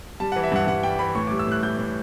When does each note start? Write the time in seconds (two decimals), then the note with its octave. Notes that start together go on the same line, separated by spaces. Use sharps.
0.20 G3 A5
0.32 E3 F#5
0.44 E5
0.52 G2 F#5
0.67 G2 F#5
0.83 G3 G5
0.99 E3 B5
1.15 A2 C#6
1.27 G3 D6
1.39 E6
1.47 A2 F#6
1.63 G3 G6
1.78 A2